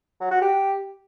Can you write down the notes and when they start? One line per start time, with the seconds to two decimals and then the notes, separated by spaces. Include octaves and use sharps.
0.21 F#3
0.31 F#4
0.42 G4